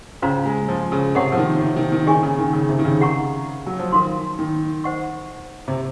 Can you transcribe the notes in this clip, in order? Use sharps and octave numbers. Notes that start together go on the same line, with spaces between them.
C#3 C#4 F4 C5 F5 A#5
G#3
F3
C#3
C3 A#4 C#5 F#5 C#6
F3
D#3
C3
D#3
D#3
C#3 D#4 G#4 D#5 G#5 C#6
C#3
D#3
C#3
C3
D#3
C#3
G#4 D#5 F#5 A#5 C#6
F#3
F3
D#3 A#4 F5 C6
D#3
C5 D#5 F#5 C#6
C3